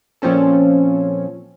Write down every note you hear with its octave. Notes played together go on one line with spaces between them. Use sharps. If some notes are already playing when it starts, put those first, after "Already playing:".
A#2 F3 C4 C#4 A4